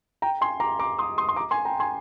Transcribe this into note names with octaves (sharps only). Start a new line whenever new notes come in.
G5 A#5
G#5 C6
A#5 D6
A#5 D6
C6 D#6
C6 D#6
C6
A#5 D6
G#5 C6
G5 A#5
G#5 C6